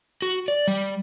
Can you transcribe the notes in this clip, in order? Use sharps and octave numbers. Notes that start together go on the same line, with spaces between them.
F#4
D5
G3